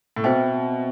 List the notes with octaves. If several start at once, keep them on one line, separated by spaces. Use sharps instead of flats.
A2
B2 C4 F#4 C5 E5 G5